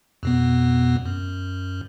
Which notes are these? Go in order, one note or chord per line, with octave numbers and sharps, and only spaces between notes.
F2 B2 B3
F#2